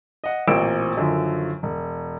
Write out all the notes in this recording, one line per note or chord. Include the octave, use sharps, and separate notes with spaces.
D#5 F#5
A1 A#2 A#3 C4 E6 D7
F#2 D3 D#3 F3
E1